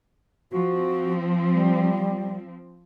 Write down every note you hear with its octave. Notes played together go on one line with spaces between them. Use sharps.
F3 C4 F#4
G3